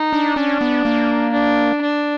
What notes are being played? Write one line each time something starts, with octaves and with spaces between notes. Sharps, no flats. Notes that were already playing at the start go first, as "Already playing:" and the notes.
Already playing: D#4
D4
C#4 D4
B3
A#3
D4
D4